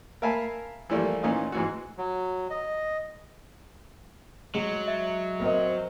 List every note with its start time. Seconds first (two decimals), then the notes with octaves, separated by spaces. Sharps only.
0.22 A#4 E5 F5 G#5 A5 B5
0.90 E3 F3 G3 A3 A#3
1.23 A#2 E3 C#4 D#4 F4
1.52 G#2 E3 F#4
1.98 F#3
2.50 D#5
4.55 F#3 G#3
4.88 E5
5.41 C4 A#4 D#5